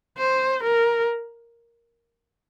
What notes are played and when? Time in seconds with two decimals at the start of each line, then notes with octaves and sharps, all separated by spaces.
0.18 C5
0.63 A#4